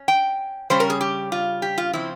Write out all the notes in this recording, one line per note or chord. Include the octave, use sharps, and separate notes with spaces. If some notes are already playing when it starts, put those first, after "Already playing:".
Already playing: C#4
G5
C#3 G3 C#4 C5
A#4
G#4
G4
F4
G4
F4
C#3 F3 C4 E4